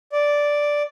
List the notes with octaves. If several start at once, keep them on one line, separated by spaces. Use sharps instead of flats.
D5